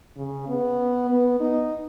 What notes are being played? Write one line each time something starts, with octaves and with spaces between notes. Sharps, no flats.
C#3
B3
B3
D#4